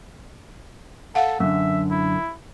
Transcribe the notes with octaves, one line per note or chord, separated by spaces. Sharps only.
A4 F5 F#5
F#2 D3 E5
E4